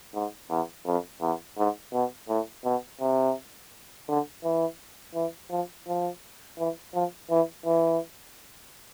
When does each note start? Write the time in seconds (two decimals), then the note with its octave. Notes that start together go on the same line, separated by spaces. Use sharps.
0.14 G#2
0.50 E2
0.86 F2
1.21 E2
1.58 G#2
1.93 B2
2.29 A2
2.65 B2
3.01 C3
4.08 D3
4.44 E3
5.15 E3
5.51 F3
5.87 F3
6.58 E3
6.94 F3
7.30 E3
7.66 E3